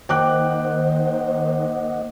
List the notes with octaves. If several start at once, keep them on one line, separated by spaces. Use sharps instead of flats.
D#3 A#3 C5 D#5 F#5 G5 D6 F#6